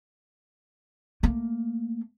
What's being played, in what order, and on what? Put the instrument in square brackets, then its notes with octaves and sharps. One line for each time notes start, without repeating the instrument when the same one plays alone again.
[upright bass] A3 A#3